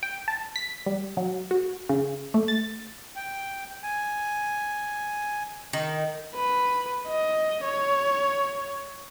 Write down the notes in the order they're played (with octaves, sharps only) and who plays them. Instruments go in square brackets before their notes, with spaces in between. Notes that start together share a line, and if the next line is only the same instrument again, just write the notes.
[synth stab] G5
A5
B6
G3
F#3
F#4
C#3
A3
A6
[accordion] G5
G#5
[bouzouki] D#3
[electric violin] B4
D#5
C#5